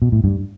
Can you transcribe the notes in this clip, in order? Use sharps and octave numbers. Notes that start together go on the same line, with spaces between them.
B2
A2
G2